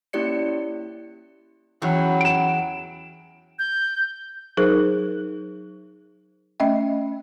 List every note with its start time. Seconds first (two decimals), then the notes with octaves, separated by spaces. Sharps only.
0.13 A#3 C#4 E4 G4 D5 C#7
1.82 E2 F#3 C#4 G5 B5
2.21 D7 E7
3.59 G6
4.57 F#3 D#4 G#4 A#4 C5
6.60 A3 C#4 D#5 E5 G5